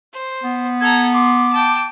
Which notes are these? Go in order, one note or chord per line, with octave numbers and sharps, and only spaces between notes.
C5
B3
A4 A#5 G#6
C6 D6
G5 A5